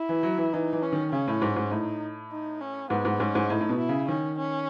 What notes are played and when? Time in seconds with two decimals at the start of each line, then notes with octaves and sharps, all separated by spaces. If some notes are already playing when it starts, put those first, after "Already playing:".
Already playing: E4
0.09 E3
0.23 F#3
0.38 E3
0.53 E3 D#4
0.73 E3
0.83 C#4
0.92 D#3
1.12 C#3 C#4
1.28 A2
1.42 G#2
1.56 G#2
1.71 A2 D#4
2.32 D#4
2.61 C#4
2.90 G#2 B3
3.05 G#2
3.20 G#2 C#4
3.35 G#2
3.49 A2 D#4
3.61 A2
3.69 B2
3.79 E4
3.89 C#3
4.08 D#3 C#4
4.38 C#4